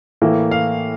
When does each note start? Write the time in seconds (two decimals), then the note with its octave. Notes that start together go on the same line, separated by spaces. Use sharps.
0.22 A2 E3 A#3
0.51 F5